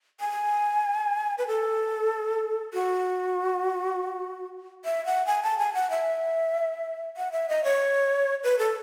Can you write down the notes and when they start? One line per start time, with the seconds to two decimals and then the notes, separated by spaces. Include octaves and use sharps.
0.20 G#5
1.38 B4
1.48 A4
2.74 F#4
4.85 E5
5.06 F#5
5.27 G#5
5.43 A5
5.59 G#5
5.74 F#5
5.91 E5
7.17 F#5
7.32 E5
7.49 D#5
7.64 C#5
8.44 B4
8.59 A4